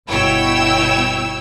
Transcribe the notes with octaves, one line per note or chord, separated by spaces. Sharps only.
G1 B2 E4 C#5 G5 E6